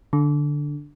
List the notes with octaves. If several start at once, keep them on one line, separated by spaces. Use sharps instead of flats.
D3